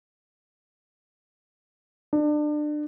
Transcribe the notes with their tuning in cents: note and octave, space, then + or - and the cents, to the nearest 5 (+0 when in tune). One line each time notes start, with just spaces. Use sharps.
D4 +30